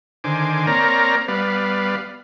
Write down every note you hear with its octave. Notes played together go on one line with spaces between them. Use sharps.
D3 D#3 C5 G#5 D6
A#3 C4 A#4 C#5 D5 A#5
G3 B3 B4 D5 F5